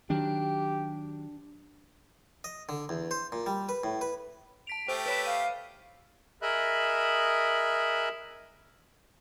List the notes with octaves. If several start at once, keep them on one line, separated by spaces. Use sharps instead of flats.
D#3 F#3 D4 G4
D#5
D3
E2
C5
A#2
G3
B4
A2
B4
A5 B6 D7 F7
A3 G4 C5 G5
B4 C#5 B5 B6
F5 F6 D#7
G#4 A#4 D#5 E5 B5 F#6